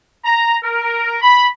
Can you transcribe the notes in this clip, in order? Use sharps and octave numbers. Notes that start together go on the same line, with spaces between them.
A#5
A#4
B5